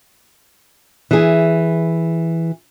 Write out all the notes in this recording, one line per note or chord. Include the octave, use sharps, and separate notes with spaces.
E3 G#4